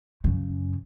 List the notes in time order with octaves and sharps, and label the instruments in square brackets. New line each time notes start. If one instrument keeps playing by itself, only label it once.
[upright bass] F#2 C#3